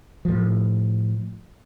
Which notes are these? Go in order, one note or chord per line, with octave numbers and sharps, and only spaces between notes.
A2 F3